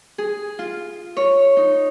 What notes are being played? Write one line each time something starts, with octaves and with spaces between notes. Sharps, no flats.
G#4
F4
C#5
D#4